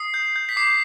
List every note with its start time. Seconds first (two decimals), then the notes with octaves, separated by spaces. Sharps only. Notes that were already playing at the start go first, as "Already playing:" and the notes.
Already playing: D#6 C7
0.14 G6
0.36 G6
0.49 B6
0.57 D6 C7